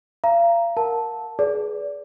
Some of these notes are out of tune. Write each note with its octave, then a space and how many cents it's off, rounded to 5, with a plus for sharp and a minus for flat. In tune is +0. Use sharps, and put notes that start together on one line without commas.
F5 -40 A#5 +0
A#4 +0 F#5 -40 A5 +0
G#4 +25 B4 -5 D5 -25